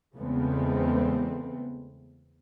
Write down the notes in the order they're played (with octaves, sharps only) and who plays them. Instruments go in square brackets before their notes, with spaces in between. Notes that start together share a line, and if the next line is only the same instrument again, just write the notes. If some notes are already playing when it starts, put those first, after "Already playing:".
[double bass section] E2 C#3 G#3 A3 B3 C4